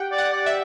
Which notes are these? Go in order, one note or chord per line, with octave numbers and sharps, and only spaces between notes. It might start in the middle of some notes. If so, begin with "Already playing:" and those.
Already playing: G4 F#5 G5
D5
F#5
D5
E5